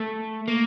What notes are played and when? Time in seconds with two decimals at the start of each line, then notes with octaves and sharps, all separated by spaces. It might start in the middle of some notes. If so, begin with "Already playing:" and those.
Already playing: A3
0.48 A#3